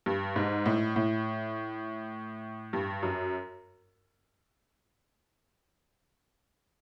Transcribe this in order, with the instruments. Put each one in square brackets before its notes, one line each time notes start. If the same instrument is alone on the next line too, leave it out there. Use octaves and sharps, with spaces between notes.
[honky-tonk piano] G2
G#2
A2
A2
G2
F#2